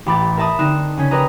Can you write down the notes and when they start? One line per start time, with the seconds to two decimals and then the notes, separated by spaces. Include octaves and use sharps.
0.06 A1 G4 B5 D6 A6
0.37 A#4 E5 A5 B5 D#6
0.59 D3 C4 D#4 F#6 E7
0.97 C#3 C#4 B6
1.11 D#4 G4 A#4 B4 D#5 A#5